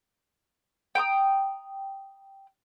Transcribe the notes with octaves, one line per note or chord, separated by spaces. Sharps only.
G5 A#5 D6 D#6